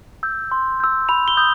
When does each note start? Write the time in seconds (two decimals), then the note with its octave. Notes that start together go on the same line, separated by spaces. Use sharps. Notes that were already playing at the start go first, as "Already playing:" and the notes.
0.23 E6 G6
0.51 C6
0.80 E6 G6
1.09 B5 F7
1.28 G7
1.37 D#6 G6